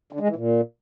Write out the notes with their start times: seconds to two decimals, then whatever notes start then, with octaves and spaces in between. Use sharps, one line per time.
0.12 D3
0.20 G#3
0.28 E3
0.36 A#2